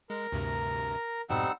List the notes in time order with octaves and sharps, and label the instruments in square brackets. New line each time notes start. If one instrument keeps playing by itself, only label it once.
[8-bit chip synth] G#3 [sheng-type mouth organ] A#4 A#5
[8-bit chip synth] D2 G2 C3
[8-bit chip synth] F2 G#2 B2 [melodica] G3 C4 D#4 [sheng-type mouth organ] F#5 E6